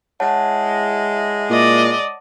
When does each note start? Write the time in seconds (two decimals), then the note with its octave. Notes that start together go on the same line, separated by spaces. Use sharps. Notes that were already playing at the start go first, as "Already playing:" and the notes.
0.20 G#3 E4 C#5 F#5 A5
1.50 A#2 D5 D#5